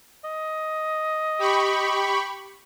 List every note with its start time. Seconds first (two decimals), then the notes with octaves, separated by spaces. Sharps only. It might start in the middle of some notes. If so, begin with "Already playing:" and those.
0.25 D#5
1.39 G4 B5 C#6